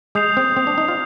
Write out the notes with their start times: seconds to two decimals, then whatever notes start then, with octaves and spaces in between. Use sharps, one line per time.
0.15 G#3 D#6 G6 C7 F7
0.37 C4
0.57 C4
0.67 D4
0.78 D#4
0.88 F4